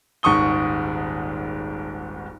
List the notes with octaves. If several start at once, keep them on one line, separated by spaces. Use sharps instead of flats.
D#1 G#1 G#2 C#6 D#6 G7